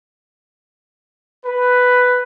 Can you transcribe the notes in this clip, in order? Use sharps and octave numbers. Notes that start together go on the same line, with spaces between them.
B4